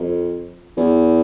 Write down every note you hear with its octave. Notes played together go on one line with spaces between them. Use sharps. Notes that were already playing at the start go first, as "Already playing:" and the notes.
Already playing: F2
E2